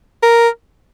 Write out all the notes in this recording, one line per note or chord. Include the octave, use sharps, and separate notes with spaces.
A#4